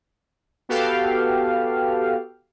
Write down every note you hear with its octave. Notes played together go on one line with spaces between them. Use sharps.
B3 F#4 G4 A4 F5